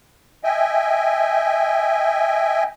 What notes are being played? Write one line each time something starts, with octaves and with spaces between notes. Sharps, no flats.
D#5 E5 G5 G#5